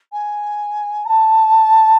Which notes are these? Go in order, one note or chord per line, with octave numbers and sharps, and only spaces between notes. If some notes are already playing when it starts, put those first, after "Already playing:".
G#5
A#5
A5